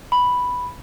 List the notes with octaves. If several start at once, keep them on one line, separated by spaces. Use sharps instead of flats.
B5